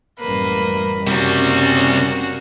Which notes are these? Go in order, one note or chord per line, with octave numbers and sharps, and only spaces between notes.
A1 F#2 G3 A#3 B4
F#1 C3 G3 A#3 C#4 F#4